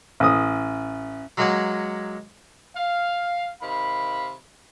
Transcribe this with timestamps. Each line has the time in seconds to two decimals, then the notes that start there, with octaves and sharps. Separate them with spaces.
0.20 A1 D#6
1.37 F#3 G#3 A#3 F#4 G#4 F#5
2.76 F5
3.61 C3 D#3 F5 B5